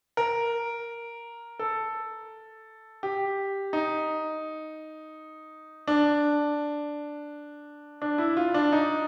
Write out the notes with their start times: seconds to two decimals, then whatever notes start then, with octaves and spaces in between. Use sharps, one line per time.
0.17 A#4
1.59 A4
3.03 G4
3.73 D#4
5.88 D4
8.02 D4
8.18 E4
8.37 F4
8.54 D4
8.73 D#4